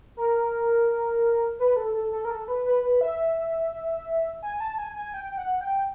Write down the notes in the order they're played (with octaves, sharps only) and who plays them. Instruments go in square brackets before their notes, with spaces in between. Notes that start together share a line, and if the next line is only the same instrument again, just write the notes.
[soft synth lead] A#4
B4
A4
A4
A4
A#4
A4
B4
B4
B4
E5
G#5
A5
G#5
G#5
G5
F#5
G5